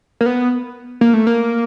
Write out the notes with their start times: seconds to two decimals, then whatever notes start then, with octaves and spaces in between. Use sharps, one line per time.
0.21 A#3
0.26 B3
1.01 A#3
1.14 A3
1.27 A#3